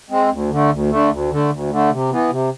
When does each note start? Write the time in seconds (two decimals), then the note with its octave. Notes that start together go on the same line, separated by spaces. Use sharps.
0.09 G#3 C4
0.30 D2
0.50 D3 A3
0.70 D2
0.90 D3 A3
1.10 D2
1.30 D3 A3
1.50 D2
1.70 D3 A3
1.90 C3
2.10 E3 B3
2.30 C3